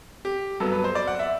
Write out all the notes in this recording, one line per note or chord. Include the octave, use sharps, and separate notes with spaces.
G4
G2 F#3 B3 A4
B4
C5
D5
F#5
E5